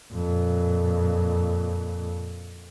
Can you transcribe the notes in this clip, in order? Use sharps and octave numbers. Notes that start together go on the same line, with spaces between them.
F2 A#2